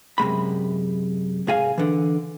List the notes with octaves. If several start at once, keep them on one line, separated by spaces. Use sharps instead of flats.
F#2 C3 G#3 B5
C2 G#2 G#4 F5 G#5
D3 E3